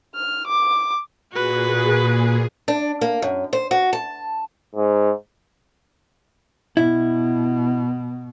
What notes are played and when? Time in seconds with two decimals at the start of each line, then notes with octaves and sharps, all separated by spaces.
0.15 F6
0.47 D6
1.32 A#2 F#4 G#4 B4
2.68 D4
3.01 A#3
3.22 F#2
3.53 C5
3.71 F#4
3.93 A5
4.75 G#2
6.77 B2 E4